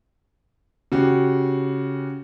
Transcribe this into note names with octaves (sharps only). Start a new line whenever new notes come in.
C#3 F#4 G4